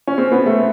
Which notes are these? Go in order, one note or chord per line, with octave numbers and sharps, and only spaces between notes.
C#4
C4
B3
A3